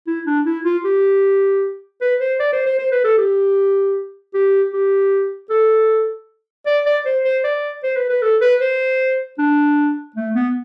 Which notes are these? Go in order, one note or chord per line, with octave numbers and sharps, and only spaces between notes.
E4
D4
E4
F4
G4
B4
C5
D5
C5
C5
C5
B4
A4
G4
G4
G4
A4
D5
D5
C5
C5
D5
C5
B4
B4
A4
B4
C5
D4
A3
B3